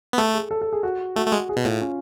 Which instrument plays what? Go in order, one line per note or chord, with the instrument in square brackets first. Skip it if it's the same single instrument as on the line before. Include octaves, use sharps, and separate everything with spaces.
[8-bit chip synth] B3
[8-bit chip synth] A3 [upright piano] A4
[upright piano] G#4
A4
A4
G#4
F#4
[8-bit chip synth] A3 [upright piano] F#4
[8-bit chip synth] A3
G#3
[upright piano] G#4
[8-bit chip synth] B2
[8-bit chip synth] A2 [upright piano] F4
[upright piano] C#4